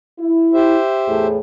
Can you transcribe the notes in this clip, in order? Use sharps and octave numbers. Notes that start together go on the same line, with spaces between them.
E4
G4 C5 E5
E2 A2 G#4